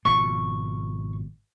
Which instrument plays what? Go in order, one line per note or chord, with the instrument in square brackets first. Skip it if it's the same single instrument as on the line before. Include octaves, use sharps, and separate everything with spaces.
[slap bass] G#1 B2 F3 [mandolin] C#6